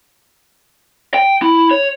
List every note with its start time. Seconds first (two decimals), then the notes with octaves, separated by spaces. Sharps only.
1.14 G5
1.42 E4
1.71 C#5